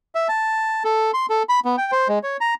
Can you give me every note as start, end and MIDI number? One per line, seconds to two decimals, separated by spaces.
0.15 0.28 76
0.28 0.83 81
0.84 1.11 69
1.14 1.26 84
1.30 1.43 69
1.49 1.60 83
1.65 1.76 59
1.78 1.91 79
1.92 2.08 72
2.08 2.19 56
2.23 2.37 73
2.41 2.54 82